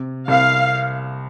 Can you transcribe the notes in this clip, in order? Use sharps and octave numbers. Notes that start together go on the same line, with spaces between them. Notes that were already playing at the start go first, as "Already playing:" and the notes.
Already playing: C3
C2 F5